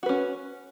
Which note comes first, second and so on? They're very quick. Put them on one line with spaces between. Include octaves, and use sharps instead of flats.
F#4 B4 C#4